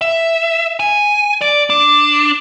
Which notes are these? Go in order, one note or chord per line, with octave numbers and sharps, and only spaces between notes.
E5
G#5
D5
D4